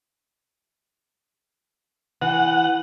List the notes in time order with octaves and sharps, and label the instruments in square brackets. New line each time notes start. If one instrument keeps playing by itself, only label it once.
[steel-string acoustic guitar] E3 [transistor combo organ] F#5